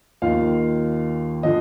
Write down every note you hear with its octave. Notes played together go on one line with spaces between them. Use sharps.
D#2 D#3 F4 F5
D3 F3 D#5